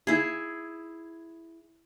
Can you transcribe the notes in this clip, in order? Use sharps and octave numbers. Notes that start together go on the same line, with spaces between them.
E4 G#4